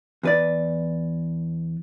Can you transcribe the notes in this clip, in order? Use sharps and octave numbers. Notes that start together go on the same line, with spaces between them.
E2 B4 D5